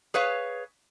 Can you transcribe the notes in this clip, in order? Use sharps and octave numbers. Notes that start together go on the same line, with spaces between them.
G#4 B4 C#5 F5